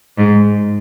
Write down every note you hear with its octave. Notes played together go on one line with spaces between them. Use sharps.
G#2